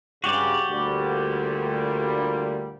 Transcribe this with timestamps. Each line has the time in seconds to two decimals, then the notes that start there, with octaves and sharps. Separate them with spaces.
0.24 G2 C#3 F#4 G4 D5
0.69 D2 A#2 G3